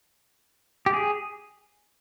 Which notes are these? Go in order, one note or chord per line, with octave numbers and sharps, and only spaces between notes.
G4
G#4